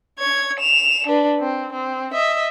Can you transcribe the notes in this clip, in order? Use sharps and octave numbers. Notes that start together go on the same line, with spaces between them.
C#5 G#6
E7 F7
D4 B4
C4
C4
D#5 E5